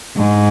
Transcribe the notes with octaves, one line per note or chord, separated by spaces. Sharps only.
G#2